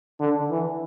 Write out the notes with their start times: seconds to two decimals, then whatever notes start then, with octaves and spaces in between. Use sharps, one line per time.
0.20 D3
0.50 E3